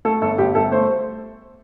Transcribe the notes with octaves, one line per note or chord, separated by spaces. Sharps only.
A3 A4
G1 A4
G1 G4
G1 A4
A3 C5